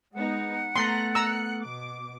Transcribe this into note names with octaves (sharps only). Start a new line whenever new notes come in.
G#3 B3 D#4 F#5
A3 B3 A#5 C6 F#6 A#6
A#5 E6 F#6 C#7
B2 D6